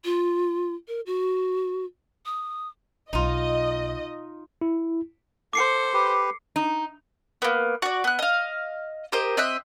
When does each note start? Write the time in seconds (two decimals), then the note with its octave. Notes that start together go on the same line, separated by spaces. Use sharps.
0.05 F4
0.88 A#4
1.06 F#4
2.26 D#6
3.13 B1 D#4 F4 D#5
4.61 E4
5.53 A4 C5 D6 C7 C#7
5.93 G4 B4
6.56 D#4
7.42 A#3 B3
7.82 F#4 D5
8.04 B3 F#6
8.19 D#5 F5
9.12 G4 A#4 C5 D#5
9.37 C4 D#5 E5 F#6